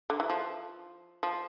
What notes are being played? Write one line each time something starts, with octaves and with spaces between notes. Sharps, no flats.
D3
E3
F3
F3